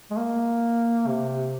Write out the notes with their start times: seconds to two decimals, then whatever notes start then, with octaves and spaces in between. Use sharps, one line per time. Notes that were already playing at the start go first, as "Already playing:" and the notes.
0.11 G#3
0.17 A#3
1.07 C3